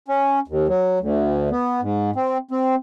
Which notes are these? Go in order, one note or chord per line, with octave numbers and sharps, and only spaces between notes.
C#4
D#2
F#3
D2
B3
G#2
C4
C4